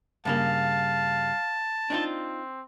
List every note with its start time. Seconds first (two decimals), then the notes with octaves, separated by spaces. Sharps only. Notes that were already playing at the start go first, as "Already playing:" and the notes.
0.25 G2 C#3 A#3 F5 A5
1.90 C4 D4 D#4 F4